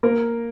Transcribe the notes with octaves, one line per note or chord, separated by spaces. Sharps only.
A#3 A#4